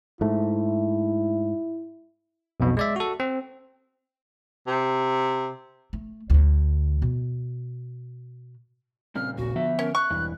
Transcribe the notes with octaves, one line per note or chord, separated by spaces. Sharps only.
G#2 A3 E4
B1 F2 B2
G#3 D5 E5
F#4 A4
C4
C3
A3
D2 D3
B2
A#2 C#3 G3 C4 F6
D#1 A#1 F#4
D3 F3 B3 D4 E5
C#4 A#4
C#6 F#6
E1 G2 E3